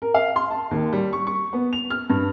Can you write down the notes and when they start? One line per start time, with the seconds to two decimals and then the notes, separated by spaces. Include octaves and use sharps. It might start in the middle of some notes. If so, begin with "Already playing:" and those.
0.02 A#4
0.14 F5
0.36 C6
0.51 A5
0.71 D#2
0.93 G3
1.13 C#6
1.27 C#6
1.53 B3
1.73 F7
1.90 F6
2.10 G2